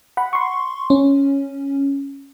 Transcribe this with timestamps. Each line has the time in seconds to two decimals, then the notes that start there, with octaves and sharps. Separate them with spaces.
0.17 F#5 B5
0.33 C6 C#6
0.90 C#4